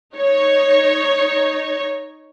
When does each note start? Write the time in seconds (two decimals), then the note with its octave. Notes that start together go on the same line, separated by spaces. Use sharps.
0.14 D#4 C#5